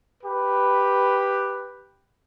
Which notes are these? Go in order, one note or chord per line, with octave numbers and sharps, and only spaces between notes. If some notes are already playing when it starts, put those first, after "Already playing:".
G4 B4